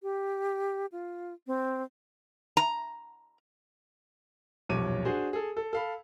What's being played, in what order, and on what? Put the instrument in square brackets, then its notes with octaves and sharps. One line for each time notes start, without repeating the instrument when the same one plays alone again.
[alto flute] G4
F4
C4
[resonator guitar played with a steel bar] A#5
[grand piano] D#1 B1 F2 C#5 D6 D#7
D4 F#4 G#4 C5
G#4 A4
A4
A4 F5 B5